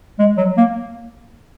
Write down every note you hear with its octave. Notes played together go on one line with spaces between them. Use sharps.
G#3
F#3
A#3